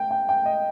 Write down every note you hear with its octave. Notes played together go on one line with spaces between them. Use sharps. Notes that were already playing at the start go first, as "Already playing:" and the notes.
Already playing: G5
G5
G5
D#5